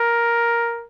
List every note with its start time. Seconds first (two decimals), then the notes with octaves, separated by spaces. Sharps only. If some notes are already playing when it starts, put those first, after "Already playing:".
Already playing: A#4